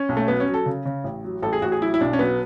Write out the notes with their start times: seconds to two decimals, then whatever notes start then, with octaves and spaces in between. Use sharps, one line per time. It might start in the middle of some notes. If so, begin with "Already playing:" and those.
Already playing: C#4
0.09 B1
0.17 A3
0.28 F#3 B3
0.40 C#4
0.48 F#3
0.54 A4
0.66 C#3
0.85 C#3
1.04 A1
1.24 F#3
1.42 A1 A4
1.53 G#4
1.62 A1 F#4
1.72 G#4
1.81 F#3 E4
1.94 E4
2.01 B1 D4
2.13 C#4
2.19 F#3 B3